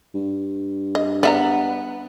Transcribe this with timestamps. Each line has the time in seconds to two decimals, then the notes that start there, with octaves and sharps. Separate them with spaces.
0.14 G2
0.95 D#5
1.23 B3 D5 E5 A#5